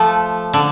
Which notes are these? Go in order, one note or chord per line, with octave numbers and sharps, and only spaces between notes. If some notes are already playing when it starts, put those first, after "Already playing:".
Already playing: F3 A3
D3